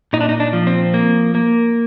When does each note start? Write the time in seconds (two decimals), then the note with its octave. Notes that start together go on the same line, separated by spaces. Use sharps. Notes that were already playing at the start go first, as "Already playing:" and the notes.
0.13 A#2 D#4
0.20 D4
0.29 D#4
0.40 D4
0.53 F3
0.67 C4
0.94 A#3
1.35 A#3